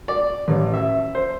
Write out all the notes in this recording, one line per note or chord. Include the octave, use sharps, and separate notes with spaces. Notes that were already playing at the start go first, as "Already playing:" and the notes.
D5
A1
E5
C5